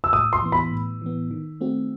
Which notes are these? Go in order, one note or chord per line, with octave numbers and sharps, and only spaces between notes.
E6
A2 D#6
C6
E3 B3
B5
A2
E3 B3
D#3
A3 C4 F#4